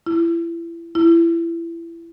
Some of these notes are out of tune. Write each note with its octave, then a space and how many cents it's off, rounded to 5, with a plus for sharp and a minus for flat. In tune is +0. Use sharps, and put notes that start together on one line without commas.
E4 +30
E4 +25